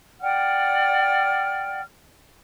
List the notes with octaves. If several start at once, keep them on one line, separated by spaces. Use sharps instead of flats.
D5 F#5 G5 F6